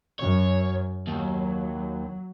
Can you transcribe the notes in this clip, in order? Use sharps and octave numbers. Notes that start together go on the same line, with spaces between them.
F#2 C#5
D#2 F#3